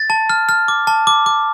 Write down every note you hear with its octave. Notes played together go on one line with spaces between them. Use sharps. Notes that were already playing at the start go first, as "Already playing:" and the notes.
Already playing: A6
A5
F6
F6
D6
A5
D6
D6